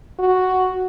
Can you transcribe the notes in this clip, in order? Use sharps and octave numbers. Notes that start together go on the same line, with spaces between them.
F#4